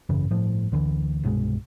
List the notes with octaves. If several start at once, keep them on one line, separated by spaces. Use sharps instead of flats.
G#1 F#2 C#3 E3
G1 A2 F3
D2 D3 E3
C2 G2 B2 G#3